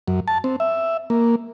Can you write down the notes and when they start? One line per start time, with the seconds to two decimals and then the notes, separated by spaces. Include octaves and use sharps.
0.08 F#2
0.28 A5
0.44 C4
0.60 E5
1.10 A#3